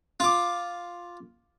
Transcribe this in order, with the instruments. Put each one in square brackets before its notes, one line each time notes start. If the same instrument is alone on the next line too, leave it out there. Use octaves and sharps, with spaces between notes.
[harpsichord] F4 D6